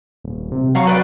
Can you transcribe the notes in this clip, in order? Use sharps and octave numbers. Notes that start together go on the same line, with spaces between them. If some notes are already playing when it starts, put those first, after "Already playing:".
D#1
C3
F#3 F5 A#5 C#6
B4 D5 G5